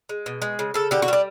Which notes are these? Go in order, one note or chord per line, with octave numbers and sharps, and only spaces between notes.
G#3
B2
G#3
C#3
C#3 A4
D3 G4
F#4
G3 D4